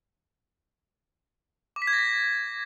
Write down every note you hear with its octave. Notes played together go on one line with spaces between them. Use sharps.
D6
B6
G#6
A#6
B6